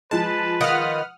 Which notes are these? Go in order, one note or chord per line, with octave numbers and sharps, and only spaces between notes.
F3 G#3 B4 A5
D#3 F4 D#5 F#5 D#6 F6